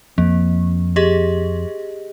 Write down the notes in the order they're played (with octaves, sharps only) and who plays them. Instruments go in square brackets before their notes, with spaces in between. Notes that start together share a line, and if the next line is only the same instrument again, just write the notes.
[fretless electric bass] F2 [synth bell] A#3
[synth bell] G4 G#4 D#5